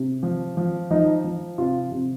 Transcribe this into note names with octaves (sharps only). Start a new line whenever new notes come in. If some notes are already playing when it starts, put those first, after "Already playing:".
Already playing: C3
F3
F3
F3 D#4
F3
C3 F4
C3